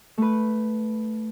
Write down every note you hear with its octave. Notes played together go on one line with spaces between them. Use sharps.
A3 B4